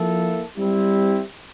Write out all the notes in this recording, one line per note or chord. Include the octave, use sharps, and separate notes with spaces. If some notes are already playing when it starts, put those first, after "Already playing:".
Already playing: F3 A#3 E4 A4
G3 C4 E4